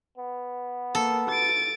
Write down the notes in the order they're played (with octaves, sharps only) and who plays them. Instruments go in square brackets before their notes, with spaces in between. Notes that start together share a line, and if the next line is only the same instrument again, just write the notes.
[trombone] B3
[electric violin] A#3 [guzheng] A4
[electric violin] A6 D7